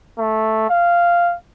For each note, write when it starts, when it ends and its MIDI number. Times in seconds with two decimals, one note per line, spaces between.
0.19 0.66 57
0.70 1.36 77